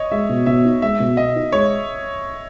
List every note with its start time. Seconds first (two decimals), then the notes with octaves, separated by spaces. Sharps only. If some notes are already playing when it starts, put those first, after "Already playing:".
Already playing: C#5 D#5
0.12 G#3 E5
0.29 B2
0.46 B2 E5
0.64 D#4
0.82 G#3 E5
1.00 B2
1.17 B2 D#5
1.35 D#4
1.52 G#3 C#5